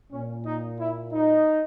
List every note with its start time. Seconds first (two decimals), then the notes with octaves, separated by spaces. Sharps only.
0.12 A#2 C#4
0.46 D#4
0.80 E4
1.13 D#4